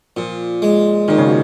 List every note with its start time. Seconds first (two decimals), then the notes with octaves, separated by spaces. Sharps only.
0.17 A#2 F3
0.62 G#3
1.08 A#2 D#3
1.18 C#3
1.26 B2